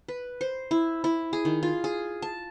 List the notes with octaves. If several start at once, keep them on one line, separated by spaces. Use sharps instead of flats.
B4
C5
E4
E4
G#4
D#3
F4
G#4
A5